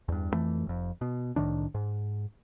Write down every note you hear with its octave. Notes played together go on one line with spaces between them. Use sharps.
E2 G2
F2 E3 A3
F1 F2
B2
C2 A2 D#3 D4
G#2